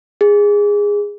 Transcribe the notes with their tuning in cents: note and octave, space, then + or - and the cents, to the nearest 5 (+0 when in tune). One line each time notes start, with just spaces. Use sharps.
G#4 -15